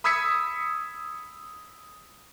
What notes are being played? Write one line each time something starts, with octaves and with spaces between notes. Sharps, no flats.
B5 D#6 E6 G#6 B6 C#7